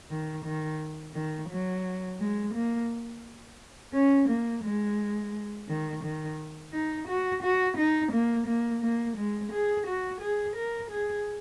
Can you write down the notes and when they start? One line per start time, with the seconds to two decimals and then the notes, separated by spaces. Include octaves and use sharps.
0.10 D#3
0.45 D#3
1.14 D#3
1.49 F#3
2.19 G#3
2.54 A#3
3.93 C#4
4.29 A#3
4.64 G#3
5.68 D#3
6.03 D#3
6.73 D#4
7.08 F#4
7.43 F#4
7.78 D#4
8.12 A#3
8.47 A#3
8.83 A#3
9.17 G#3
9.53 G#4
9.87 F#4
10.22 G#4
10.56 A#4
10.91 G#4